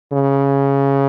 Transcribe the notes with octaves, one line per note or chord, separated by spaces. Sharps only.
C#3